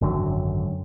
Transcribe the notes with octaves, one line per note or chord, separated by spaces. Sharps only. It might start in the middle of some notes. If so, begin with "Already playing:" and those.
G#1 F#2 D3 F#3